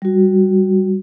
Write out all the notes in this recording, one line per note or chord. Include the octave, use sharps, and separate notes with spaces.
G3 F#4